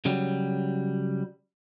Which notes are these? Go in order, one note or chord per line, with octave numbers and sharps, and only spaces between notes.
C#3 F#3 G3